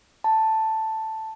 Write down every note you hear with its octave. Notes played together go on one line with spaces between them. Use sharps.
A5